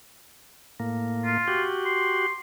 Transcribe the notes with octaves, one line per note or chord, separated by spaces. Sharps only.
A2 A#3
F4
F#4 G4
C6